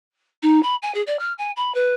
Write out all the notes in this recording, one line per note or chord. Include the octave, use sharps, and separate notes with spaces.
D#4
B5
G#5
G#4
D5
F6
G#5
B5
B4